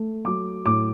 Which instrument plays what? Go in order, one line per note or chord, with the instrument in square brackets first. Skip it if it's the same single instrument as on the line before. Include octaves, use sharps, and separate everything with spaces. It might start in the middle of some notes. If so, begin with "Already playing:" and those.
Already playing: [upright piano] A3
F#3 D6
A2 D6